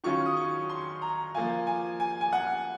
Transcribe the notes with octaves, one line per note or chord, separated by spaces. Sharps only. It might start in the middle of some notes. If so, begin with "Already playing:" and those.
D#3 F#3 C#4 F4 C#6
D#6
C#6
C6
A#5
F3 A#3 F4 G#5
G#5
G#5
G#5
F#5